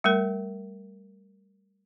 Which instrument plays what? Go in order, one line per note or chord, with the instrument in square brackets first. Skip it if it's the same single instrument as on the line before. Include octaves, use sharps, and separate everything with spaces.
[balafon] G3 A3 A#4